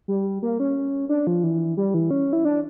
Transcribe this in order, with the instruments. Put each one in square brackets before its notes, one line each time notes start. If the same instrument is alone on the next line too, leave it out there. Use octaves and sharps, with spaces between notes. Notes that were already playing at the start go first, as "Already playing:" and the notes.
[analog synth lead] G3
A#3
C#4
D4
F3
E3
G3
E3
C#4
E4
D4